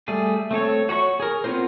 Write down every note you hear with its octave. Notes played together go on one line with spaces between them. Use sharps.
G3 A3 G#4
A3 C4 A4 C#5
F#4 C#5 A#5 C#6
G#4 A#4
B3 C4 F4 A#4 C5